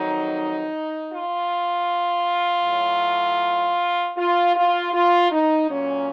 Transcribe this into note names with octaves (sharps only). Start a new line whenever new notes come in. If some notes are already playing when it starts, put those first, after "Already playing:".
Already playing: F2 D#3 F#3 D#4
F4
A2 F#3
F4
F4
F4
D#4
A#2 F#3 C#4